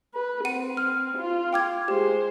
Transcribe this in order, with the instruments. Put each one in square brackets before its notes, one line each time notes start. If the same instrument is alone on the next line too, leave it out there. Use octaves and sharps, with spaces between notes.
[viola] B4
[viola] C4 [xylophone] F#5 D#7
[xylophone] F6
[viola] F4
[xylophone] G5 D6 G#6
[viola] G#3 C5 [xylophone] G4